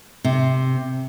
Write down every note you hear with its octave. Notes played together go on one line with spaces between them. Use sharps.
C3